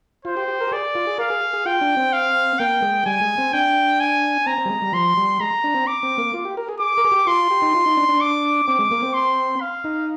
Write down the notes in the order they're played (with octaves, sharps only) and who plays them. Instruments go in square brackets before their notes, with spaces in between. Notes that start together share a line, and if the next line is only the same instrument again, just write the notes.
[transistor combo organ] F4 [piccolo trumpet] C5
[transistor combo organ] G4
G4
A#4
G4
[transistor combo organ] G#4 [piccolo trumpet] D5
[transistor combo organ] F4
G#4
[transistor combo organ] A#4 [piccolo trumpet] F5
[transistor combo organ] G#4
G#4
[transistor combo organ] F4 [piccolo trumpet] G5
[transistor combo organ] D4
C4
[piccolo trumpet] F5
[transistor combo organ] A#3 [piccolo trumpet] G5
[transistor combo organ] G#3
[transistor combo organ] G3 [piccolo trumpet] G#5
[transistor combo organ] G#3
C4
[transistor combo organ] D4 [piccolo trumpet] G5
[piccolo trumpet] G#5
[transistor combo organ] C4 [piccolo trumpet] A#5
[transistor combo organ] C4
G3
G#3
G3
[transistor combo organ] F3 [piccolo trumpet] C6
[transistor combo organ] G3
[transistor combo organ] G#3 [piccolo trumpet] A#5
[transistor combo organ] D4
C4
[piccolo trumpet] D6
[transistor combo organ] C4
A#3
F4
G4
A#4
G#4
[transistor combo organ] G#4 [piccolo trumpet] D6
[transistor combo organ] A#4
G#4
G4
[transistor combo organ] F4 [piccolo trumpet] C6
[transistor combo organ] G4
D#4
F4
D#4
D4
D4
[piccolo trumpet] D6
[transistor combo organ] C4 [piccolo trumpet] D6
[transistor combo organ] G#3
A#3
C4
[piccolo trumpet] C6
F5
[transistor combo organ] D#4